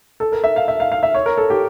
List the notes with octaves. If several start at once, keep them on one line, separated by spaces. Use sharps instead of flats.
A4
A#4
E5
F5
E5
F5
F5
E5
C#5
A#4
A4
G4